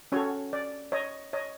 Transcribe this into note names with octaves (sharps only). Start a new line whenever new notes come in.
C#4 F#4 A4 C#5
D5
C#5 D#5
C#5 D#5